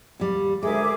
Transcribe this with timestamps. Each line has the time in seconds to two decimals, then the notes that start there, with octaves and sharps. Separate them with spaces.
0.20 D#2 G3
0.63 D2 G#3 G#4 A#4 E5 D6